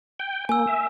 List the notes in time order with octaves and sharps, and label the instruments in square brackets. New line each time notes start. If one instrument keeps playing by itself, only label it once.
[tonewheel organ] G5
[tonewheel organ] A#3 [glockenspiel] G#5 E6
[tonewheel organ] E5